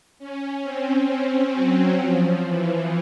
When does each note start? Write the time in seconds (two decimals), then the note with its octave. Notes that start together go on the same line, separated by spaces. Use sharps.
0.19 C#4
0.63 C4
1.09 C4
1.53 F#3
1.99 F3
2.44 E3